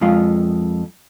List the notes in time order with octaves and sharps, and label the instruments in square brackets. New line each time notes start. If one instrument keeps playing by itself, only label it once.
[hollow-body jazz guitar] F2 G#3 F4 F5